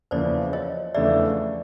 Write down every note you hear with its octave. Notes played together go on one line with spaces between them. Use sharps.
E2 C#3 F3 A#3 C5 D5
C#5 D#5
E2 C#3 F3 A3 D4 D5 E5